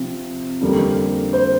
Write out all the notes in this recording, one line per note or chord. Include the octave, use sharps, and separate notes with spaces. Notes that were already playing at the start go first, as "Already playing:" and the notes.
Already playing: C3 F3 C4
F2 D3 G3 A#3
C5